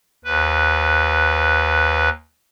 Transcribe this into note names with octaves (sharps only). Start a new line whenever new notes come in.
D#2 B4